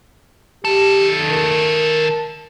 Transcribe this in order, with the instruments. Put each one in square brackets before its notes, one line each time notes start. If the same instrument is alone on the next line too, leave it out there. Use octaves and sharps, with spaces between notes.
[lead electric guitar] D#3 A4 [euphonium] G4
[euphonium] A#4